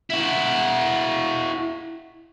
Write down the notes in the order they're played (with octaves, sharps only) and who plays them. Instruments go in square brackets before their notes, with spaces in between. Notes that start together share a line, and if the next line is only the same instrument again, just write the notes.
[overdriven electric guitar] E4 F#4